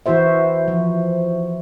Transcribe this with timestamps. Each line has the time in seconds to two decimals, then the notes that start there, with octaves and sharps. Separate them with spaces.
0.06 E3 E4 F#4 C5 E5
0.68 F3